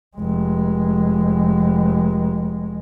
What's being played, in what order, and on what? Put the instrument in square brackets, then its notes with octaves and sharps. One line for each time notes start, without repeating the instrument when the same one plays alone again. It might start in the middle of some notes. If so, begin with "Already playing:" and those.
[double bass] F1 G#3